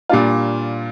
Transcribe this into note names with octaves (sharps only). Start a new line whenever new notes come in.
A#2 G3 D4 F4